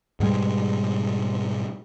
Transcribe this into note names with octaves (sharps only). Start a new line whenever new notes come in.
G#2 B2 G3 G#3